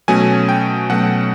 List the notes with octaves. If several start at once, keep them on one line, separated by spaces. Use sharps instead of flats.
B2 F#3 A3 C#4 G#5
G5
B2 F#3 A3 C#4 F#5